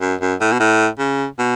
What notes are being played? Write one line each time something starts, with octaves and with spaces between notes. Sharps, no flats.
F#2
F#2
A2
B2
A2
C#3
B2